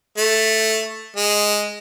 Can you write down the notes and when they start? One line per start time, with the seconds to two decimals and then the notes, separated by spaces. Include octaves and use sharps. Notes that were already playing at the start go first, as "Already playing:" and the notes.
0.18 A3
1.17 G#3